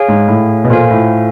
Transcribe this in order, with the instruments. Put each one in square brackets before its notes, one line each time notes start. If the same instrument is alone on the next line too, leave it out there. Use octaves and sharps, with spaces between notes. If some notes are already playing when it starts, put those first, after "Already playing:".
Already playing: [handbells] G#4 C#5 F5 G#5
[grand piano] G#2
A2
B2
[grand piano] A#2 [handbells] F4 A4 C5 F5 G#5
[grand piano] A2